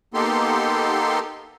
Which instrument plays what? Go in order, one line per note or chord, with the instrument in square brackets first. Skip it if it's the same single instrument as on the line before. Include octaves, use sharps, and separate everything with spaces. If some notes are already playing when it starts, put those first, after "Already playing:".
[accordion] A#3 B3 D#4 G4 A4 C6